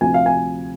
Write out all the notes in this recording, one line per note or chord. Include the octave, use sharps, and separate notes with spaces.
D2 C3 F3 G#5
F5
G#5